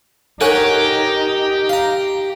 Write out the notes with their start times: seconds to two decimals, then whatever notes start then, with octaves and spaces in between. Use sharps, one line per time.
0.41 D#4 G4 A#4 C#5 F#5 G#5
1.69 F5 A#5